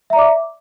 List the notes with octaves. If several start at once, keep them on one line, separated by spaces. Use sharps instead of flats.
D5 E5 A#5 D6